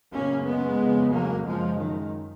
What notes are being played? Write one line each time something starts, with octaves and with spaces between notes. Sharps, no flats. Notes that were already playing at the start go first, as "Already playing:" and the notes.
F#2 C#3 A#3 C#4
G#3 B3
F2 C#3
F#3 A#3
F#2 C#3 F3 G#3
D#3